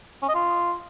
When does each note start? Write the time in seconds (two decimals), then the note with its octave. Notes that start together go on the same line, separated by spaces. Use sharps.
0.23 C#4
0.29 D#5
0.35 F4